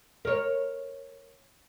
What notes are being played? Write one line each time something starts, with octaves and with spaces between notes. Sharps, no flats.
A#4 C#5